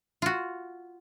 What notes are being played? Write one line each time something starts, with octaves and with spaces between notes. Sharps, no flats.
F4 F#4